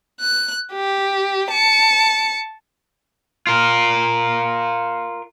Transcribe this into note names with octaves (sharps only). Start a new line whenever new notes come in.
F#6
G4
A5 C#7
F4 A#4